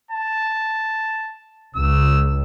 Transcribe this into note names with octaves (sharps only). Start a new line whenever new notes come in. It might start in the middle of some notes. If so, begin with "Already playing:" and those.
A5
C#2 E6